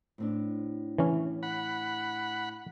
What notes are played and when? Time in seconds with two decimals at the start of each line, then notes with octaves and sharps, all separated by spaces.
0.18 A2 C4 D4
0.98 E3 C#4
1.43 F#5 B5